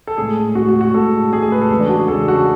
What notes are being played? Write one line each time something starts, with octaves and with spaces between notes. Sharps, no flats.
A4
A2 G#3 G#4
A2 G#3 F#4
F#4
F#4
A2 G#3 A4
A2 G#3 G#4
G#4
B4
A4
E2 C#3 G#3
D4
F#4
G#4
E2 C#3 G#3 A4
F#4